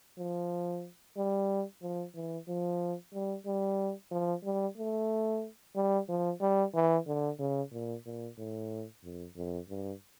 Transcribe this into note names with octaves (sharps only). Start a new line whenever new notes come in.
F3
G3
F3
E3
F3
G3
G3
F3
G3
A3
G3
F3
G3
E3
D3
C#3
A#2
A#2
A2
F2
F2
G2